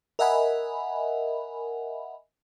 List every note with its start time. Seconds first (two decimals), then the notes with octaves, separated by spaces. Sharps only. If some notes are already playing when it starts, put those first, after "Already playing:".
0.19 A#4 D#5 E5 F#5 G#5 B5